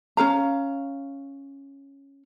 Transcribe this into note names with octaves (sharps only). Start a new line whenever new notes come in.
C#4 A#4 F5 A#5